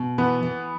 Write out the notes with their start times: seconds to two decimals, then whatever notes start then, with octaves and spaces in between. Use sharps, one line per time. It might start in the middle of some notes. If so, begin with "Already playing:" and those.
Already playing: B2
0.18 E3 B3
0.43 E3